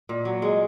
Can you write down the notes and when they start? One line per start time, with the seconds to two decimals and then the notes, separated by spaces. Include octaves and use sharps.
0.09 A#2
0.25 F#3
0.42 G#3